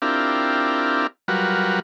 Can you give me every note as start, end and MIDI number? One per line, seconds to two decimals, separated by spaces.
0.02 1.07 60
0.02 1.07 62
0.02 1.07 64
0.02 1.07 65
0.02 1.07 67
0.02 1.07 70
1.28 1.80 54
1.28 1.80 55
1.28 1.80 65
1.28 1.80 66
1.28 1.80 70
1.28 1.80 71